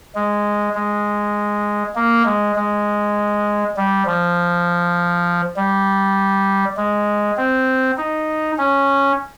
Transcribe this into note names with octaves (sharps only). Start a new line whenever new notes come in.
G#3
G#3
A#3
G#3
G#3
G3
F3
G3
G#3
C4
D#4
C#4